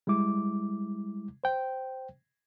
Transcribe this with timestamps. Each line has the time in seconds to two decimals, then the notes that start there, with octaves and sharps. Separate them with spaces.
0.07 G3 G#3 E4 D6
1.44 C5 G5